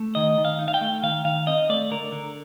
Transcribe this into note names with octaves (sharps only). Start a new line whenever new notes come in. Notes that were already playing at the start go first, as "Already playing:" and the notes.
Already playing: A3
D#3 D#5
D#3
F5
D#4
F5
G5
A3
D#3 F5
D#3 F5
C4 D#5
A3 D5
D3 A#4
D3